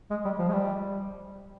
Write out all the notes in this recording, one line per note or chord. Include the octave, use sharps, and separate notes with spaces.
G#3
G3
F3
G#3
G3